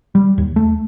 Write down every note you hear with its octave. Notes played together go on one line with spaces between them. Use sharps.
G3
D#2
A3